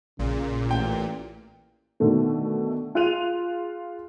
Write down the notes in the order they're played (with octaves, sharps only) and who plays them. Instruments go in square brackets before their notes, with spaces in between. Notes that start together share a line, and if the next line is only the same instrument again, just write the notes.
[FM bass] A#1 [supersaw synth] A#2 [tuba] C#3
[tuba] A1 [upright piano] G5
[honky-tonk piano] B2 D3 D#3 A3
F4 G#4 F#6 D#7 F7